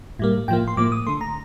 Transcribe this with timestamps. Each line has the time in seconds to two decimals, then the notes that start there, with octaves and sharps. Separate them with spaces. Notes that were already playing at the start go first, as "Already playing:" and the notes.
0.19 A2 G3 A#3
0.48 A2 F3 A#3 G5
0.68 C6
0.77 A2 F3 A#3 D6
0.92 D#6
1.06 D3 A3 C6
1.21 A#5